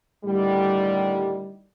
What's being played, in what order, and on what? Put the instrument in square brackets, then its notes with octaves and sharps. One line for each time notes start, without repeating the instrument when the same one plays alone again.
[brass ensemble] A2 D3 D#3 G3